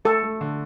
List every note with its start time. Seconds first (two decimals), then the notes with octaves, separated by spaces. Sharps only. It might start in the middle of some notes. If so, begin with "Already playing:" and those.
0.05 A3 A4
0.23 A3
0.41 D3